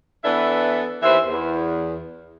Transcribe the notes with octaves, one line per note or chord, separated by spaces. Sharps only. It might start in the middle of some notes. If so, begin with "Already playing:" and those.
E3 B3 D4 A4 B4 E5
D#2 E3 B4 C5 E5
E2